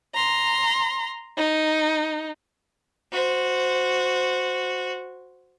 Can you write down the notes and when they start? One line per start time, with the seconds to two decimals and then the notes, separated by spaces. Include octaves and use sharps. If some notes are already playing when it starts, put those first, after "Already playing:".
0.15 A#5 C6
1.37 D#4
3.12 F#4 C5